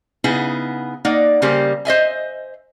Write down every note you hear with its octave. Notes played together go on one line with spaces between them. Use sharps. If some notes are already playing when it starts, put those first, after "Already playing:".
C#3 B3 D#4 E4 G#4
A#3 D#4 D5 F#5
C#3 G3 A#3 G4 C5
C5 D#5 E5 G#5